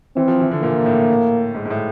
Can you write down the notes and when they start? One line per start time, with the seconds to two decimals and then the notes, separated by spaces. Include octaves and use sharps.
0.16 E3 C4
0.28 F3
0.40 E3
0.51 D3
0.62 A#2 A#3
0.86 A2
1.55 G#2
1.66 G#2
1.70 A2